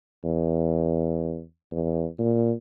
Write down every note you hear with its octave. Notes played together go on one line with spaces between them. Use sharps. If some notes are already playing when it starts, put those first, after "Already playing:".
E2
E2
A#2